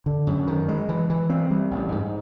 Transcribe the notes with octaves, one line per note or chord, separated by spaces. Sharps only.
D3
F#2
D#3
G#3
E3
E3
C4
G3
A1
G#2